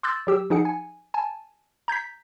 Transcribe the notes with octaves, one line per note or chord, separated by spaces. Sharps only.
C6 D6 E6 F#6 G6 A6
F#3 G4 E6
F3 D#4 G#4 F#5 C#7
G#5
G#5 A5
A#5 G6 G#6 B6